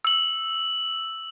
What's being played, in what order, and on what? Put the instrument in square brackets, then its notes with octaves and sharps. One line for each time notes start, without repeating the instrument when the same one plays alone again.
[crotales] E6 F#7